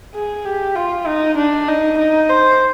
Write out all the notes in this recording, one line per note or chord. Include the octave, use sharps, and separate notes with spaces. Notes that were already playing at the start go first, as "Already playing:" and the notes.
G#4
G4
F4
D#4
D4
D#4
D#4
C5